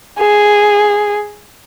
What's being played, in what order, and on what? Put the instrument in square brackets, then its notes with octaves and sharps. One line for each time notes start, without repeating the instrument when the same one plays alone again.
[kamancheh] G#4